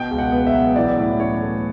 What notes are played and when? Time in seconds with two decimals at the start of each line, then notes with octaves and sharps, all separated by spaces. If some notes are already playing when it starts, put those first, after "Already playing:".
Already playing: B2 G5
0.11 C#2
0.18 F#5
0.32 B3
0.47 E5
0.54 F#3
0.76 E3 D5
0.98 A2
1.19 C#4 C#5
1.42 A3